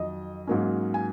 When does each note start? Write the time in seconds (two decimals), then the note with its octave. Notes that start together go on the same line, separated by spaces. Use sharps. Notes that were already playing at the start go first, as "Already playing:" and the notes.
Already playing: F2 D#3 F#3 D#5
0.47 G#2 F#3 A#3 C#4
0.94 G#5